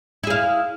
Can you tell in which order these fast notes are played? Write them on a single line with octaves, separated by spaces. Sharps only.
E4 G#4 F5